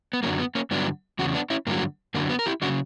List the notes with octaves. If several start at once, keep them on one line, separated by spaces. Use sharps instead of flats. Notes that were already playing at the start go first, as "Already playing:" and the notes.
B3
F#2 D3 F#3 A#3 C#4
B3
A#3 C#4
G2 D3 F#3 B3 D4
E2 C#3 F#4
B3 D4
C#4 E4
G2 D3 F#3 A#3
F#2 D3 F#3 A#3
B3
A#4
E4 G4
C#3 F#3 D4 F#4